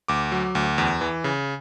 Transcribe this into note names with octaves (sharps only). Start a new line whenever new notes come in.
D2 D6
F#3
D2
E2
E3
C#3